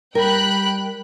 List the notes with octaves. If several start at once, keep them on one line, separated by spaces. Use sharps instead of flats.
G3 A#4 G5 B5 F#6